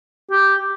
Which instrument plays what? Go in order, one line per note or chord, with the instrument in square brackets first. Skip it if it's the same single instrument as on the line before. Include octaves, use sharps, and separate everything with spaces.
[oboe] G4